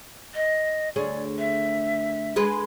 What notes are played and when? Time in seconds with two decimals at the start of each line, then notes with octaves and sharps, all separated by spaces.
0.35 D#5
0.96 D2 G#4 C#5 D5
1.38 E5
2.36 G#3 G#4 B4